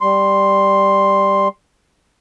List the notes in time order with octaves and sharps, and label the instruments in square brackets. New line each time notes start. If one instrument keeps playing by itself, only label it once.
[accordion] G3 C6